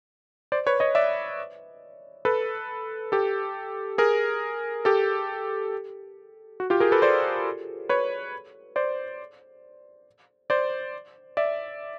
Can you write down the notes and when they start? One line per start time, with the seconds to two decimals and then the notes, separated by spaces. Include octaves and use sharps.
0.52 C5 D5
0.67 B4 C#5
0.80 C#5 D#5
0.95 D5 E5
2.25 A4 B4
3.12 G4 A4
3.98 G#4 A#4
4.85 G4 A4
6.60 F#4
6.70 F4 G4
6.80 G#4 A#4
6.92 A4 B4
7.02 C5 D5
7.89 B4 C#5
8.76 C5 D5
10.50 C5 D5
11.37 D5 E5